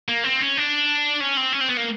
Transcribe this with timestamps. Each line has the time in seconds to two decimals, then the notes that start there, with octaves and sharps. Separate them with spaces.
0.09 A#3
0.24 C4
0.40 C#4
0.57 D4
1.20 C#4
1.37 C4
1.53 C#4
1.61 C4
1.69 B3
1.77 A#3